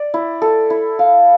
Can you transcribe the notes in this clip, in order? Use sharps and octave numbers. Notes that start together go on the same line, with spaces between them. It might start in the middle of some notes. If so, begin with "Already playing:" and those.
Already playing: D5
E4
A4
E4
F5